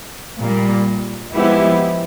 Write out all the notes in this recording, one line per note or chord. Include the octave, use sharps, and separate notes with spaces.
A#2 G3 A#3
F3 G#3 B3 E4 G4